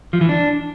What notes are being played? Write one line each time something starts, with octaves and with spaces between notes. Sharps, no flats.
F3
E3
D4